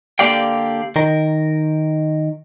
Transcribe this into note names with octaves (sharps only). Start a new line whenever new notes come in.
D3 A#3 G4 D5 F5 G5
D#3 A#4